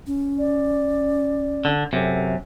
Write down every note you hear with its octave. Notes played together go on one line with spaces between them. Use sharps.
C#4
D5
D3
F#2 C3 A4